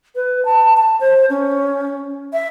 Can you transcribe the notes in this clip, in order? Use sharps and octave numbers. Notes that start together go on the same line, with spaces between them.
B4
A5
A5
C5
C#4
E5